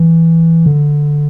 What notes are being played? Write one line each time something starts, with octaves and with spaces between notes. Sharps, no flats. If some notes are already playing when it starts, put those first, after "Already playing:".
Already playing: E3
D3